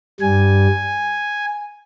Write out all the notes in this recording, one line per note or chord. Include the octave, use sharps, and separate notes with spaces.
G2 G3 G#5